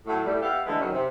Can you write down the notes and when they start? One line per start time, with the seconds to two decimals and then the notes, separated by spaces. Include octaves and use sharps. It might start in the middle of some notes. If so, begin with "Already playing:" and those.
0.06 A2 F#3 A3
0.24 A2 G3
0.41 B3 G4 E5 F5
0.66 D3 E3 G#3 A3 A4 B4
0.79 F#2 D#3 F#3 C#4
0.93 C3